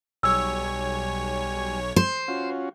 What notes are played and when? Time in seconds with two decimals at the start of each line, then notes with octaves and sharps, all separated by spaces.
0.23 B1 G3 C#5 G#5 E6
1.96 C5
2.28 C#4 F4 F#4